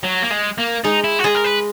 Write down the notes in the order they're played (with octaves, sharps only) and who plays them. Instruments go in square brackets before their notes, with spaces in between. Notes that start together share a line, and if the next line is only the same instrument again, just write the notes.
[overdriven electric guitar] F#3
A#3
G#3
A#3
[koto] G#3 [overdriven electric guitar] D#4
[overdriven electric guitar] E4
F#4
[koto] G#3 [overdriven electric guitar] G#4
[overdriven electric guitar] A#4
B4